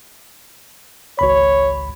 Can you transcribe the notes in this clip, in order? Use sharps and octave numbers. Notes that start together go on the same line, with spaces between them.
G#1 C#2 C#5 B5